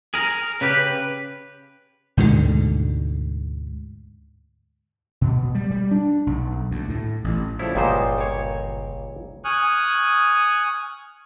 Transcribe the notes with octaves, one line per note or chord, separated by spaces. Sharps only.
G#4 A#4
C#3 G4 B4
D2 G#2 B2 D3
B2
G3
G3
D4
B1
D2
A2
A1
C#3 F3 G3 E4 A4
G1 C#2 A#2 G3 B3 C5 D#5
A#3 C#5
G#5 C#6 D#6 F6 F#6